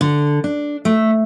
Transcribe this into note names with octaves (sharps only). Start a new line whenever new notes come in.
D3
D4
A3